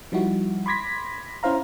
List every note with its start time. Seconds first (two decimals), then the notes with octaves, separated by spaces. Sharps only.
0.12 F3 G3 D#4 E4 F#4
0.66 B5 C6 D6 G#6 A#6 B6
1.43 C#4 E4 C5 F5 A#5